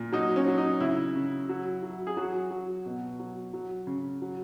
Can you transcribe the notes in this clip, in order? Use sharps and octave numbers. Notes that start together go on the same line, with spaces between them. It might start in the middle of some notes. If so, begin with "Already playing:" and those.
Already playing: A#2
F#3 D#4
C#4
F#3
D#4
C#3 E4
C#3
F#3
F#3
G#4
F#3 F#4
F#3
B2
F#3
F#3
C#3
F#3